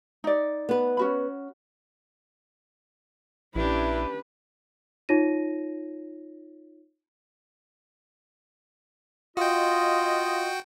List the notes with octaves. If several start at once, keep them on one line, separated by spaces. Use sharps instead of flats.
D#4 D5
B3 B4
C#4 F#4 B5
A#1 C#4 D4 E4 G4 B4
D#4 F4 C#5 A#6 D#7
F4 F#4 D#5 G5